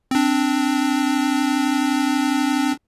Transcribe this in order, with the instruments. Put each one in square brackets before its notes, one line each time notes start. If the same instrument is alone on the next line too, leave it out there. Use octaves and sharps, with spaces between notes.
[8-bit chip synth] C4 D4